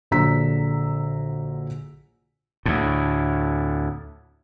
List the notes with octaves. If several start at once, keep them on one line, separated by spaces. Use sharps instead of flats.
A#1 D3 F#3 A#5 E6 B6
D2 A2